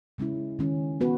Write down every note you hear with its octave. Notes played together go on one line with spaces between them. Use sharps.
C#3 G#3 C#4 E4
D#3 G#3 C#4
G#3 B3 F#4 B4